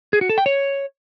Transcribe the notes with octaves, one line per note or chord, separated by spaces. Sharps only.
G#4
F#4
A4
G5
C#5